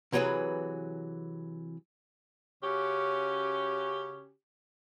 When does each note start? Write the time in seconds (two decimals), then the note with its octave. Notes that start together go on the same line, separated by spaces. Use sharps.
0.12 C3 E3 F#3 F#4 G#4 B4
2.62 C#3 C#4 F#4 G4